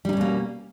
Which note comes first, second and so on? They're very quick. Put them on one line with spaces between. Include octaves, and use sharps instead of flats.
G3 D#4 C#4 B2 A#3